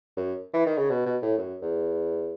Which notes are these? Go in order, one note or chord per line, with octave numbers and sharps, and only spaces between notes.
F#2
E3
D#3
C#3
B2
B2
A2
F#2
E2